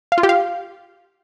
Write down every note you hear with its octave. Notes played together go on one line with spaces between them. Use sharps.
F5
F4
G4
F5